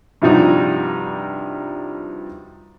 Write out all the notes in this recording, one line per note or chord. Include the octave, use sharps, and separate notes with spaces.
G2 C3 F3 G3 D#4 F#4